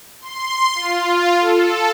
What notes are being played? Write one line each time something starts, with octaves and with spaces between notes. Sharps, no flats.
C6
F4
A4